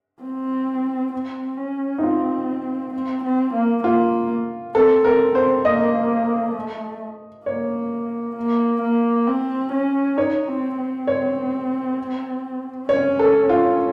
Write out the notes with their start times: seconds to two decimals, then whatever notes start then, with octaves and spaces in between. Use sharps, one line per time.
0.23 C4
1.13 C4
1.57 C#4
1.98 D#4
2.03 C4 F4
2.94 C4
3.24 C4
3.54 A#3
3.84 A#3 F4
4.75 C4 A4
5.04 C4 A#4
5.35 C4 C5
5.65 A#3 D#5
6.55 A3
7.46 A#3 C#5
8.36 A#3
8.82 A#3
9.27 C4
9.73 C#4
10.18 D#4 C#5
10.48 C4
10.77 C4
11.07 C#5
12.89 C#4 C#5
13.19 A4
13.49 F4